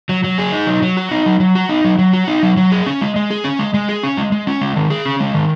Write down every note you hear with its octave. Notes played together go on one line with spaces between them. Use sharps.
F#3
F#3
G#4
D#4
F#3
F#3
F#4
D#4
F#3
F#3
F#4
D#4
F#3
F#3
F#4
D#4
F#3
F#3
G#4
C#4
G#3
G#3
G#4
C#4
G#3
G#3
G#4
C#4
G#3
G#3
C#4
G#3
D#3
G#4
C#4
G#3
D#3